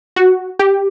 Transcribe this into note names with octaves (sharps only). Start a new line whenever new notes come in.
F#4
G4